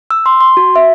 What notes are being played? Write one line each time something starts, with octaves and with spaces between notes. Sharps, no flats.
E6
C6
C6
F#4
E5